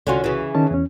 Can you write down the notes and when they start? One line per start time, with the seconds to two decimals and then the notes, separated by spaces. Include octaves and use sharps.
0.07 C2 D3 C#4 F4 F#4
0.24 C#3 E3
0.55 D#3 C#4 A5
0.71 E2 C#4